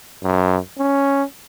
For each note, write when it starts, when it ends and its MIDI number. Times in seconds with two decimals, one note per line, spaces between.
0.23 0.58 42
0.79 1.23 61